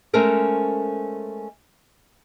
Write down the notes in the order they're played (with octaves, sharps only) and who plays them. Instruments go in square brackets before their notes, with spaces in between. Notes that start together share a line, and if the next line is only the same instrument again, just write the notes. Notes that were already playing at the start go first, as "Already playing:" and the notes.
[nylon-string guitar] G#3 A3 C#4 A4 A#4 C5